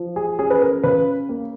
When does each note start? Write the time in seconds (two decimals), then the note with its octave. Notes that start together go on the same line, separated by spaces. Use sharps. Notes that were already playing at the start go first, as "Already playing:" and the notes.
Already playing: F3
0.16 G#4
0.39 C#4 G#4
0.50 B4
0.62 A#4
0.83 C#3 B4
1.29 A#3